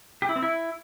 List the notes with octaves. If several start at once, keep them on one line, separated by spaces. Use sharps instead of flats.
G4
E4
C4
E4